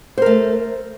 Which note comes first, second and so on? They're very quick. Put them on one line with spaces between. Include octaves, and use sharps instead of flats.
C5 A#4 A3